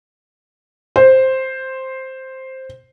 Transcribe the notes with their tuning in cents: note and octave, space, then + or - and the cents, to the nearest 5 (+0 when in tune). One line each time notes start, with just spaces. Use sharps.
C5 +5